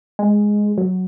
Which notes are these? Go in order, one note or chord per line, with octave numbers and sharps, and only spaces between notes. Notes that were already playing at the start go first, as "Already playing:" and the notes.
G#3
F#3